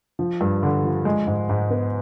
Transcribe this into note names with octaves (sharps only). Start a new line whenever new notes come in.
F3
G2
D3
F3
G#3
G#2
G#2
B3